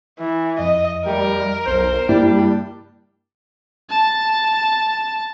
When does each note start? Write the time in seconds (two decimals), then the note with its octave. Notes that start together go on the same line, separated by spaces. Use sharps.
0.19 E3
0.59 F2 D#5
1.06 G3 A3 G4 A#4
1.66 B1 C5
2.09 G2 G3 A#3 D4 E4 G4
3.90 A5